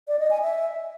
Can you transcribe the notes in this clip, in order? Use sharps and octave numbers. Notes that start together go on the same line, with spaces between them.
D5
D#5
G#5
E5